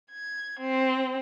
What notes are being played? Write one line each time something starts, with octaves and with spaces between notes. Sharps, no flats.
G#6
C4